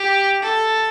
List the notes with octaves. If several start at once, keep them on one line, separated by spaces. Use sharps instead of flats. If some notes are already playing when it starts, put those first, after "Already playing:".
Already playing: G4
A4